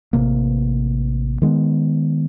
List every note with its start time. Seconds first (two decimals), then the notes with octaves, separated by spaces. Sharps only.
0.13 A1 C3 A#3
1.42 D#3 G#3 B3